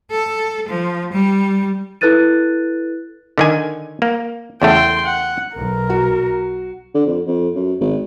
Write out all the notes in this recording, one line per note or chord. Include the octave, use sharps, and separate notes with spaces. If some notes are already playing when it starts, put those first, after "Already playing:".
A4
F3
G3
E4 A4 B4 F#6 A6 D#7
D3 D#3 G#5
A#3
E2 C#3 A3 G5 C6
F#5
B1 A#4
F#4
D3
F2
F2
F#2
G#1